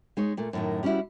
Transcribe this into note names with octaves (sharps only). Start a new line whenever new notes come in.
G#3 D#4 C#5
A#2 A3
F#2 A2 D#3
G3 C#4 D#4 E4 F#4